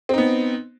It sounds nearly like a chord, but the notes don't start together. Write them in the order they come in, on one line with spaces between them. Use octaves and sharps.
C4 D#4 B3